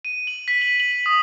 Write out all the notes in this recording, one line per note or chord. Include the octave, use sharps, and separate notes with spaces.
D#7
F#7
B6
F#7
F#7
D#6